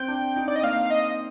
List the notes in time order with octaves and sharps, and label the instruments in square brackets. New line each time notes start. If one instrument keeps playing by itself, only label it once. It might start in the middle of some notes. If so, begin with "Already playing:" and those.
Already playing: [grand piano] C4 [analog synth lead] G5
[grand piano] D4
D#4
[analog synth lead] D5
D#5
[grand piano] A#3 [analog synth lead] F5
[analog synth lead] F5
D#5